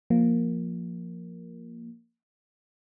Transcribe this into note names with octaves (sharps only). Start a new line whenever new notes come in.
F3 A#3